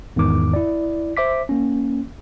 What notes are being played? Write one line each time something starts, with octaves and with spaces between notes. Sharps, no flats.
E2 G#2 D#3 D6
E4 D5
C5 E5 D6 B6
A#3 C#4